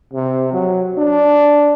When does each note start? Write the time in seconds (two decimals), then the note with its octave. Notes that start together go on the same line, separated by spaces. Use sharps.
0.14 C3
0.53 F#3
0.98 D4